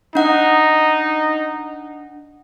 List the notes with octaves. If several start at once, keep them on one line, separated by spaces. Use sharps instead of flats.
D4 D#4 F#5